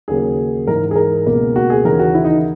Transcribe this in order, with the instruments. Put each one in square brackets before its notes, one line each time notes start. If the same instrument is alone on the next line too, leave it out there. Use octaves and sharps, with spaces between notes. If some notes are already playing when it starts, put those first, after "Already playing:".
[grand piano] D#2 C#3 F#3 A#3 G#4
G#2 E3 G#3 A#4
G#4
A#4
C#2 B2 A#3
F#4
G#4
D#2 C#3 E3 A#4
F#4
E4
D#4